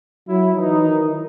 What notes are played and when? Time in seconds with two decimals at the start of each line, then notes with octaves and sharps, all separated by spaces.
0.29 F#3 E4
0.56 E3 D#4
0.85 D#3